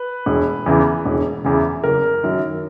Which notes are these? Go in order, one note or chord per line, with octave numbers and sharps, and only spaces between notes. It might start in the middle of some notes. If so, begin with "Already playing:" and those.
Already playing: B4
E1
E2 C#3 E3
E1
E2 C#3 E3
F#1 A#4
F#2 D#3